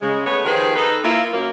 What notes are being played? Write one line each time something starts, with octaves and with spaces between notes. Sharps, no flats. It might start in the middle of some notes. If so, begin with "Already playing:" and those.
C#3 G#3
A3 B3 G#4 C#5
D#3 F3 G4 G#4 B4 C5
D#4 A4 B4
A#3 E4 F4
F#2 A#3